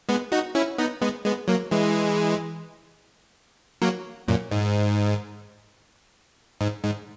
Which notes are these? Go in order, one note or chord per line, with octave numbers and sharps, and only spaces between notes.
G#3 B3
D#4 F#4
C#4 E4
B3 D#4
G#3 B3
G#3 B3
F#3 A#3
E3 G#3
F#3 A#3
F#2 A#2
G#2
G#2
G#2